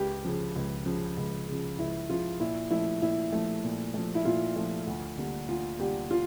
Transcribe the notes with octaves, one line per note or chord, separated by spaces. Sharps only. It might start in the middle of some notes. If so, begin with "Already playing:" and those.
Already playing: C#2 G4
C#3 F3
C#2
C#3 F3
C#2
C#3 F3
C#2 E4
C#3 F3 F4
A#2 E4
F3 A3 E4
A#2 E4
F3 A3
A#2
F3 A3
E4
A#2 F4
F3 A3
D2
D3 G3 A#3
D2 F4
D3 G3 A#3 G4
F4